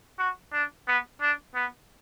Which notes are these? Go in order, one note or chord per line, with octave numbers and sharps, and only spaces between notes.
F#4
D4
B3
D4
B3